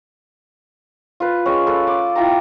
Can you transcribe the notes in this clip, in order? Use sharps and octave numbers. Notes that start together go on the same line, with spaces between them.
F4 B4
G#3 C#4
A4 B4
C6 D6
E4 F4 G5 A#5